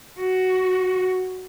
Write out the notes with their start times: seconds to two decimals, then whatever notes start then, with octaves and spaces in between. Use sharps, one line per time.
0.19 F#4